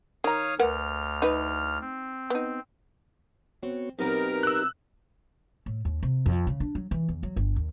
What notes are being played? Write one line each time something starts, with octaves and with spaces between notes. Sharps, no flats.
D#3 C#5 F5 A#5 D#6
D2 A#4 B4 F#5 F6
D#4 B4
C4
B3 D#4
B3 C4 F#4 C#5
B1 C3 B3 D#4 G4 A#4 B4
E6 F#6
A2
D#2
C3
F2
C#3
D4
F#3
E3
E2
F#3
G1
D#2